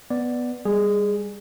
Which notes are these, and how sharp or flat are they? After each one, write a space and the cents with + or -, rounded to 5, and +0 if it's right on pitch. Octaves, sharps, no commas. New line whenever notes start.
B3 +0 D5 +5
G3 +25 G#4 -5